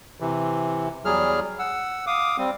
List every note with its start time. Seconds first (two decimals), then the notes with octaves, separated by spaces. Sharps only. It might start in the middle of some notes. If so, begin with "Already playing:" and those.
0.20 C3 E3
1.05 E2 F#3 G3 G#4 F6
1.59 F#5 E6
2.07 F5 D6 D#6
2.38 G3 C4